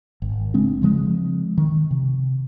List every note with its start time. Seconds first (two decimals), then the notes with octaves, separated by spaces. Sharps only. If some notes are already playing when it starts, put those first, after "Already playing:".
0.22 G#1
0.54 C#3 G#3 C4 D4
0.82 C#3 F3 G#3 C4
1.58 D#3
1.91 C3